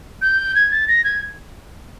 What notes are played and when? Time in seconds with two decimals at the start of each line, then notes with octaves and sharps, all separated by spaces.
0.21 G6
0.55 G#6
0.71 A6
0.87 A#6
1.04 G#6